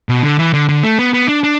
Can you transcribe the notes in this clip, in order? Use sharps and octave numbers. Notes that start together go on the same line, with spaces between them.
B2
D3
E3
D3
D3
A3
B3
B3
D4
D4